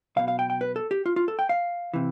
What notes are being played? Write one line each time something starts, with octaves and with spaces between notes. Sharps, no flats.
B1 B2 F5
F5
G5
G5
B4
A4
G4
F4
F4
A4
G5
F5
C3 E3